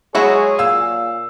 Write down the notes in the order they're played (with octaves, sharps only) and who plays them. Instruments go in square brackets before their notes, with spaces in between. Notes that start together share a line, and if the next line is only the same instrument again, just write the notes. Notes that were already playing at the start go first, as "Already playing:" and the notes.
[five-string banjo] F#3 E4 F#4 [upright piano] G#3 [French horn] G#4 [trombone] C#5
[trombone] A#2 [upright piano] F5 E6